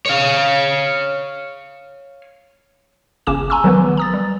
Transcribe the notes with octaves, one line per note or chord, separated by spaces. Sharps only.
C#5 F5
G1 C#3 C#4 D6 E7
G#5 A#5 C6 C#6 E6
D#3 F3 F#3 B3 B4
A#5 D#6 A6
G3